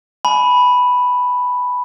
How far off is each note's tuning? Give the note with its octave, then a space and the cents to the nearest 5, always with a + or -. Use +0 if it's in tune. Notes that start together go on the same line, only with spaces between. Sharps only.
G#5 +35 B5 +0